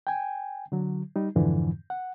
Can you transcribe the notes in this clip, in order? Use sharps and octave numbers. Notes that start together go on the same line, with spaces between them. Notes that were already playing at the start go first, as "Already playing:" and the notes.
G5 G#5
D3 F#3
G3 D#4
F2 G#2 D3 E3 F3
F#5